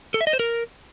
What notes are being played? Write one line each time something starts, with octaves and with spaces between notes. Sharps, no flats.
A4
E5
D#5
C5
A#4